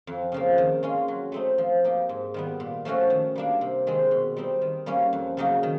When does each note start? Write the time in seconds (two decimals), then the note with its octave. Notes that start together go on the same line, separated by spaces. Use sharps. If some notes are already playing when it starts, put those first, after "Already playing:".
0.07 F2
0.32 C#3 F3 A#3
0.58 D#3
0.83 G#3 C#4 F4
1.08 F#3
1.32 A3 C4 D#4
1.58 F3
1.84 A#3 D#4 G4
2.09 G#2
2.34 D#3 G3 B3
2.60 A#2
2.85 F3 A3 C#4 F#4
3.10 D#3
3.36 G3 A#3 D4
3.61 C3
3.87 D#3 G#3 C4
4.11 B2
4.37 G3 C4 D#4
4.62 D#3
4.86 G3 A#3 C#4
5.13 F2
5.37 C#3 F#3 A#3 D#4
5.63 D#3